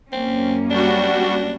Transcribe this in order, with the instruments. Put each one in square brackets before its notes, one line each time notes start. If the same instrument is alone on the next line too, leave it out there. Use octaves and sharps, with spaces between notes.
[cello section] F#2 A#3 C#4 [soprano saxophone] C4
[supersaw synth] G3 F#4 [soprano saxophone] D4